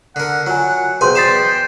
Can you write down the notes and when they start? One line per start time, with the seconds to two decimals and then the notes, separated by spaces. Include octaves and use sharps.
0.16 D3 A#4 F#5
0.47 F#3 F4 G#5
1.01 B1 G#4 B4 C5 G5 G#5 C6
1.15 D5 D#5 B5 A6 C7 E7